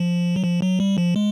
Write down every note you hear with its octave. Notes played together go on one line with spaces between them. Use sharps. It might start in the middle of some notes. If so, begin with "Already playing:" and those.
Already playing: F3
F#3
F3
F#3
G3
F3
G#3